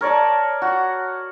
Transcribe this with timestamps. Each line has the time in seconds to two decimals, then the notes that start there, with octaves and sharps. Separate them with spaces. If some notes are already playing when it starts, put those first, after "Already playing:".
0.01 A#4 C#5 D5 A5
0.62 F#4